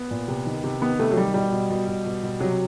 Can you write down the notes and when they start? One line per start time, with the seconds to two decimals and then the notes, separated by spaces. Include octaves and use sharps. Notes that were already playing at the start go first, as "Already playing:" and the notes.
Already playing: B3
0.11 A#2
0.28 C3
0.46 D#3
0.64 C3
0.81 D#3 B3
0.99 C3 A3
1.11 F#3
1.17 D#3 G3
1.34 B2 G3
1.52 B2
1.70 B2
1.88 B2
2.06 B2
2.23 B2
2.40 C3 F#3